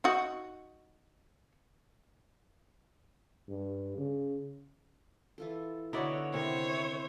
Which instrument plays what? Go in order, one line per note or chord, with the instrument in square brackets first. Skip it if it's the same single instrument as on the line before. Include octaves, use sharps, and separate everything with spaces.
[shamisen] D#4 F#4
[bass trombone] G2
C#3
[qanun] E3 F4 A4
[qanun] D3 B3 [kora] D#4 E4 D5 [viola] F#4 C#5
[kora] C3 D#3 [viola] E4 C5 [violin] C#5